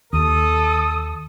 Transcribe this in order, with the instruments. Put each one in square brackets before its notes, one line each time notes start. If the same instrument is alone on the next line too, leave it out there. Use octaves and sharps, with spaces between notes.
[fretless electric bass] D#2 [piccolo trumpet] A4 [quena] D#6